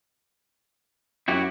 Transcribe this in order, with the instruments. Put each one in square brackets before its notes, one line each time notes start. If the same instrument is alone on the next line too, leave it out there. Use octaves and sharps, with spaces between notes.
[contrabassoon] F#2 [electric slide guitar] E4 F#4 G4